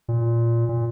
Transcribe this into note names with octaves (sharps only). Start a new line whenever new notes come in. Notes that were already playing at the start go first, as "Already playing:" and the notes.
A#2
A#2